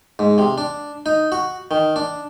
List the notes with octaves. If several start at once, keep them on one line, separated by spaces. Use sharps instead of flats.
G#2
C3
D4
D#4
F#4
D#3
D4